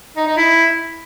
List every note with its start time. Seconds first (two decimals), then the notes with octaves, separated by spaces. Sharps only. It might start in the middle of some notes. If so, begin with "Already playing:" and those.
0.17 D#4
0.27 D#4
0.37 E4